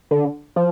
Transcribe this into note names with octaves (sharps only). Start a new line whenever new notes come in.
D3
F3